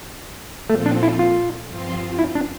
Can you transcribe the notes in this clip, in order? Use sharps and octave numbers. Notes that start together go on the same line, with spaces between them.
A#2 F3 A3 C4 F4 A4
D4
E4
F4
G2 F3 C4 F4 C5
E4
D4